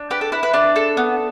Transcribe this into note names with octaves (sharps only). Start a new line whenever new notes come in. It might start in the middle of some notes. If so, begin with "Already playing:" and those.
Already playing: D4
G4 B4
A4
E4 B4
B4
D4 D5
A4
B3